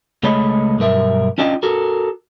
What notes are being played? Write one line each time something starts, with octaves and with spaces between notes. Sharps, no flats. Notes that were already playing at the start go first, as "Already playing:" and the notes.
C#2 G#3 A3 C#5 D#5 B5
B1 G2 A#4 E5
C#4 D4 F4 D#5 F5 G5
F#4 A4 A#4